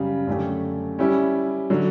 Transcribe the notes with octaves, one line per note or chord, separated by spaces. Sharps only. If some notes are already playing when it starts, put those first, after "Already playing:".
Already playing: F#2 C#3 G3
F#2 D3 A3 C#4 G4
G3 C#4 E4 G4
D3 F#3